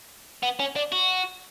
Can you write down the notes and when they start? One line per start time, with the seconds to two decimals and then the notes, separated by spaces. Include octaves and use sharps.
0.43 B3
0.60 C#4
0.76 D4
0.92 F#4